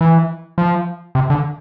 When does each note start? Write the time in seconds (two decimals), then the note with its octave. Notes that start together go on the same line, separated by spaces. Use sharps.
0.01 E3
0.58 F3
1.15 C3
1.30 D3